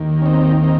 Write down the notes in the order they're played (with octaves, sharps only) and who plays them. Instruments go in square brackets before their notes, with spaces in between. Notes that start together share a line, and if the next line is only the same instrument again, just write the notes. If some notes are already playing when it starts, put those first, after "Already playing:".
Already playing: [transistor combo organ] D#2 D#3
C#4
C4 D#4
C4 D#4